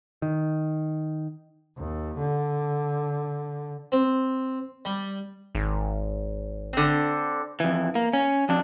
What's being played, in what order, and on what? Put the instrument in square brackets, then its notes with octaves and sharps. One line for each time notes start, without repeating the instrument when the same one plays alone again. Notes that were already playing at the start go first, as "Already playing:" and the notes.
[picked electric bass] D#3
[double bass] D#2
D3
[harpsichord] C4
G3
[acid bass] G#1
[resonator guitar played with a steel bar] D3 C4
[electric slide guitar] F2 E3
A#3
C#4
F2 D4